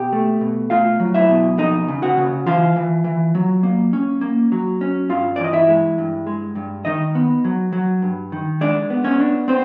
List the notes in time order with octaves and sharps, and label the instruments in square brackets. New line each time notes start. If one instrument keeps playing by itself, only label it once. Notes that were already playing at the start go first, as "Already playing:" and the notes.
Already playing: [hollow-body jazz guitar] B2 G4 G5
A3
B2
A3 F4 F5
F#3
E4 E5
B2
F2 D#4 D#5
C#3
F#4 F#5
C#3
E3 F4 F5
E3
E3
F#3
A#3
C#4
A#3
F#3
C#4
G2 F4 F5
D5
E3
D#5
E4 E5
G#3
G2
G#3
G2
D#3 D#4 D#5
B3
F#3
F#3
G2
D#3
G#3 D4 D5
B3
C#4 C#5
D4
B3 C4 C5